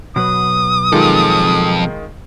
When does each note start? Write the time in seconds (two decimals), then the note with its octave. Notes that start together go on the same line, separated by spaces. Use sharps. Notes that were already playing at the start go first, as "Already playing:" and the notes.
0.16 B2 F#3 B4 D#6
0.92 F2 D#3 G#3 F4 A4